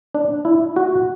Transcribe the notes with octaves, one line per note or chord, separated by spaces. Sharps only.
D4
E4
F#4